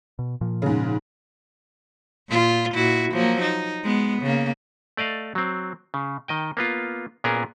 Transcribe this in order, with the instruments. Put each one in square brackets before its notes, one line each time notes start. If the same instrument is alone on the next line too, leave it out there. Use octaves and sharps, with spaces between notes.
[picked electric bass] B2
A#2 F3
[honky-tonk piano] G#2 C#3
[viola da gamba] A#2 F4
A#2 E4 F#4
F3 F#3 A#3
D#4
G#3 B3
C#3 A#3
[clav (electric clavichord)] A3 D5 D#5 F5
F#3 C4
C#3
D#3 D#5 G5
A#3 B3 F4
A#2 B3 C#4 G#4 A#4